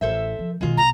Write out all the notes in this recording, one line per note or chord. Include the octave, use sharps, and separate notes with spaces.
A1 A4 C5 E5
F3
B2 D#3 G#3 F4
B1 A#5